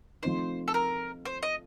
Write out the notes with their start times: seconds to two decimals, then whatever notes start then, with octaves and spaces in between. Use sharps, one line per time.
0.22 F3 A3 C4 D#4 C5
0.68 A4
0.74 A#4
1.25 C5
1.43 D#5